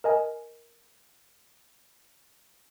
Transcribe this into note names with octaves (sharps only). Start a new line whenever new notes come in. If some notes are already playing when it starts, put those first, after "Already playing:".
A#4 D#5 G#5